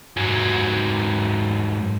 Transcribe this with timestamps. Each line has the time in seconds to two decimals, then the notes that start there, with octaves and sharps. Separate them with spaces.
0.17 G#2 F#3